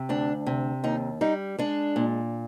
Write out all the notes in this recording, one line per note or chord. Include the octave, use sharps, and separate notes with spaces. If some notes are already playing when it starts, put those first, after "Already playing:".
Already playing: C3
D2 D4
C3
D#2 D#4
G3 D#4
G#3 D4
A#2